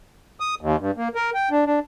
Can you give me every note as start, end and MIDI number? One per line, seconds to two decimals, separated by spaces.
0.40 0.55 87
0.61 0.76 39
0.80 0.91 43
0.97 1.08 58
1.15 1.30 70
1.34 1.49 79
1.51 1.65 62
1.66 1.79 62